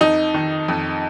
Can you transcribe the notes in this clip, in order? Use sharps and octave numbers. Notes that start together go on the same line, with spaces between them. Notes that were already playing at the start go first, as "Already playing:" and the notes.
F2 D#4
D#3
F2